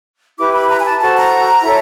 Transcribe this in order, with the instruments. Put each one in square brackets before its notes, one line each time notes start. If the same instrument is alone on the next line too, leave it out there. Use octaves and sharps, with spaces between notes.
[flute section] E4 G4 B4 D6
B5
A#5
G#5
A5
F#4 A4 C5 A5
A#5
E4 A4 C#5